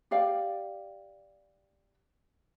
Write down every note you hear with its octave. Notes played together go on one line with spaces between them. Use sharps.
G4 D5 F5 G5